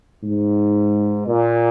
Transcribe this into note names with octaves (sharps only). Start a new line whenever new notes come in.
G#2
A#2